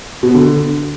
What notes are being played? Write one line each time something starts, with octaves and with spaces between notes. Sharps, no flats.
B2
B3
D3